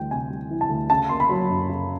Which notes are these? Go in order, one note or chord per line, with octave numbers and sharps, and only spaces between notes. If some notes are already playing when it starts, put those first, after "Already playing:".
Already playing: D2 E3 G3 G5
C3 G#5
G3
E3
A5
D2
C#3 A5
A#3 C6
B5
F#3
F#2
C#3